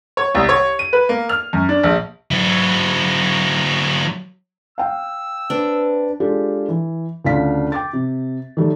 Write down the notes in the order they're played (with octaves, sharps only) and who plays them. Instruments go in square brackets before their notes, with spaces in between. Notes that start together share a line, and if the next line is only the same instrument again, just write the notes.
[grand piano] C#5
C2
C#5
D#7
B4
A#3
F6
F#2
D4
A#1
[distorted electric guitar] F#3 E4
[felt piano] F5 G5 [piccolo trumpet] E6
[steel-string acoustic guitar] C4 B4 [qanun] D4
[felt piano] G#3 D4 F4 G4 A4
E3
D2 C#3 D4 F4 F5 B6
G5 D6 A6
C3
D#3 F#3 G3 A3